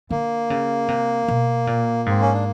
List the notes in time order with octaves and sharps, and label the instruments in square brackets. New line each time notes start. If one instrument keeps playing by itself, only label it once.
[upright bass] D3 [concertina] A#3
[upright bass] C#3
C3
B2
A#2
[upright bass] G#2 [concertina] C4
[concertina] C#4
D4